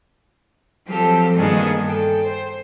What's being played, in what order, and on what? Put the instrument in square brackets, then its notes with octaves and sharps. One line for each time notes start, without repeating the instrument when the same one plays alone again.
[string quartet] F3 F#3 C4 G4 A4
G2 D#3 A#3 B3 D4 G#4
A4 G5
C5